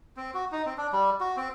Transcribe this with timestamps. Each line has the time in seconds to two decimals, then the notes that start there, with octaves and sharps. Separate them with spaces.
0.17 C4
0.34 F#4
0.52 D#4
0.66 C4
0.78 D4
0.93 G3
1.20 F#4
1.37 C4